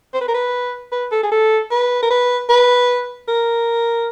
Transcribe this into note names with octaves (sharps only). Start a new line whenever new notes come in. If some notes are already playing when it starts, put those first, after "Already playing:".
C5
B4
A#4
B4
B4
A4
G#4
A4
B4
A#4
B4
B4
A#4